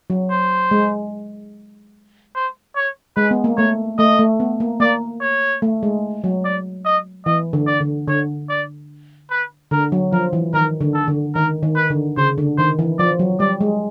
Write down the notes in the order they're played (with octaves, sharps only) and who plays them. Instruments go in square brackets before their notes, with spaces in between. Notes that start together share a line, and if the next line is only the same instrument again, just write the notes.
[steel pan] F#3
[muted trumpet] C5
[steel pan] G#3
[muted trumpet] C5
C#5
[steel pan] G#3 [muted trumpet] B4
[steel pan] B3
A#3
[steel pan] A3 [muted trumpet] C#5
[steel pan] A3 [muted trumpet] D#5
[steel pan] A3
B3
A#3
[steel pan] A#3 [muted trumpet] D5
[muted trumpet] C#5
[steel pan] A3
G#3
F#3
[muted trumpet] D5
D#5
[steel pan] E3 [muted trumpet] D#5
[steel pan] D3
[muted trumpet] D5
[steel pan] D3
[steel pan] D3 [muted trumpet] C#5
[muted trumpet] D5
B4
[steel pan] D3 [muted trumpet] A#4
[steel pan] F#3
[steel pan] F3 [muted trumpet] A#4
[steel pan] E3
[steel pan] D#3 [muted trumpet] A#4
[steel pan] D3
[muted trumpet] A4
[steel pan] D3
[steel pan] D#3 [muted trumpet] A#4
[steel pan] D#3
[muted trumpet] B4
[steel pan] D3
[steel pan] C#3 [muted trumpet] C5
[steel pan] D3
[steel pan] D#3 [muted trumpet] C5
[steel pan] E3
[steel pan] F3 [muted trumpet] D5
[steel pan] F#3
[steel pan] G3 [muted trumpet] D5
[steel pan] G#3